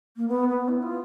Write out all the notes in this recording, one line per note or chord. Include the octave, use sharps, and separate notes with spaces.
A#3
B3
B3
E4
F4